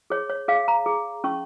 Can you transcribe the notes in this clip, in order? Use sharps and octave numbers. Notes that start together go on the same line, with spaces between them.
G#4 C#5
C#5
G#4 F5
A#5
G#4
C#4 C#6